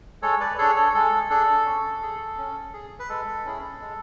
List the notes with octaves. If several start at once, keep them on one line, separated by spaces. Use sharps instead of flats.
G#3 A4 C#5
B4 D5
D4 G#4 A4 C#5
A4 C#5
G#3 A4
D4 G#4 A4
C#4
G#4
C#4
G#4
B4
G#3 A4
C#4 E4 G#4
G#3